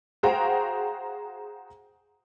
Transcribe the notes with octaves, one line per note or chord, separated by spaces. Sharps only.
F#4 G#4 C5 F5 G5 A#5